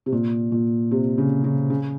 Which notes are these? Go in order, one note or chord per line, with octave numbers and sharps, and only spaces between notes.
C3
A#2
A#2
C3
C#3
C#3
C#3